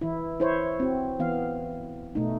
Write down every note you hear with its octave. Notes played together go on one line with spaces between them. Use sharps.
E3 E4
E4 C5 C#5
C4 F#4
E3 B3 F5
B2 A3 D#4